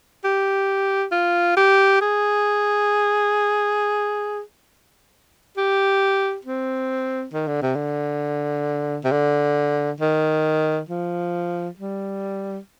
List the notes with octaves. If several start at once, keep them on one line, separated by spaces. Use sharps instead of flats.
G4
F4
G4
G#4
G4
C4
D#3
D3
C3
D3
C3
D3
D#3
F3
G3